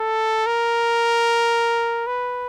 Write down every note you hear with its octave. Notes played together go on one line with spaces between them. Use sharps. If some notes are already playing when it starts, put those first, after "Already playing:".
Already playing: A4
A#4
B4